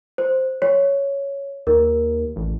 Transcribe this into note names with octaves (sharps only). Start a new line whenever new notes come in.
C5
C#5
D#2 A#4
A1